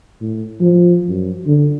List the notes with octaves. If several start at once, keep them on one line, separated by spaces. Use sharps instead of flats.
A2
F3
F#2
D3